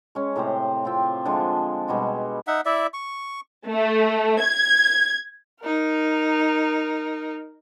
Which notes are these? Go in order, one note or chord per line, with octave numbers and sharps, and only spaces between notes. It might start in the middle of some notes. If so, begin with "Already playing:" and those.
G#3 C#4
A2 C3 G4 C5
C4 F4 G5
D3 F3 G#3
B2 G3 G#3 F#4
D#4 E5 F#5
E4 D5 E5
C#6
A3
G#6
D#4 A#4